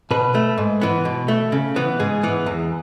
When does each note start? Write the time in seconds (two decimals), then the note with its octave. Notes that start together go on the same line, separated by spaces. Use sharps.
0.11 B2 B4
0.35 A3
0.58 G#2
0.81 E3 B3
1.05 B2
1.28 A3
1.52 C#3
1.76 E3 B3
2.00 G#2 G#4
2.23 E3 B3
2.46 E2